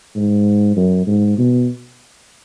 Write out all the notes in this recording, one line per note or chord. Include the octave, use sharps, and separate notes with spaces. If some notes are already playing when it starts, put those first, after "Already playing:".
G#2
F#2
G#2
B2